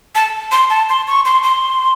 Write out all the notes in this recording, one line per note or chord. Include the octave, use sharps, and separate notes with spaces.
A5
C6
A5
C6
C#6
C6
C6